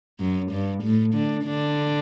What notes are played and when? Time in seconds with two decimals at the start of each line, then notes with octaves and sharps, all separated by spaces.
0.20 F#2 F#3
0.51 G2 G3
0.83 A2 A3
1.14 D3 D4
1.45 D3 D4